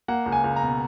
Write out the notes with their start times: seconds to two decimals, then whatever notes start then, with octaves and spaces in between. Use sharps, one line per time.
0.08 A#3 F#5
0.26 C#2
0.32 G#5
0.44 C#2
0.56 A#5
0.62 B2